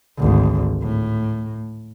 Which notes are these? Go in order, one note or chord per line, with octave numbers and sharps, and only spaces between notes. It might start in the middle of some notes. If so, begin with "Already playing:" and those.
G#1 D2
A2